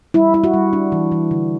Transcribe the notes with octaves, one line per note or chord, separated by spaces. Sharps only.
G3 E4
E4
F#4
G3
D4
E3
E3
D3